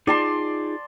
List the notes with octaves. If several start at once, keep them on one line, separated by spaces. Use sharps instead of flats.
D#4 F4 G#4 D5 A5 C6